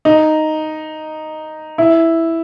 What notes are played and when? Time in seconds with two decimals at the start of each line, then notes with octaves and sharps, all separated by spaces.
0.05 D#4
1.78 E4